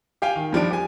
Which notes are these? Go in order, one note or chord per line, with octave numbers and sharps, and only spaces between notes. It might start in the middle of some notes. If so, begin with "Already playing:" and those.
G4 F5 G5 G#5
D#3
G2 F3 D4 D7
G4 G#5